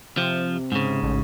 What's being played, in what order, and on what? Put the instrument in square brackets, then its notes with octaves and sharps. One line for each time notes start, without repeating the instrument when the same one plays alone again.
[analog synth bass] C3 [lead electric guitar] F3
[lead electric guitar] G#2 C#3
[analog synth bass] A1